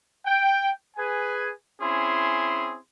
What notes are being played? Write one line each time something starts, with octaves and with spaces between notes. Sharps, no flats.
G5
G#4 B4 G#5
C4 C#4 E4 G#4 C6